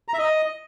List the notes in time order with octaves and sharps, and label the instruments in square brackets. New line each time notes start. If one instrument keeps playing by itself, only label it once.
[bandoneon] A#5
E5
D#5